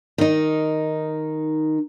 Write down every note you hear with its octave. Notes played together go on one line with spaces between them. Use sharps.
D#3 D#4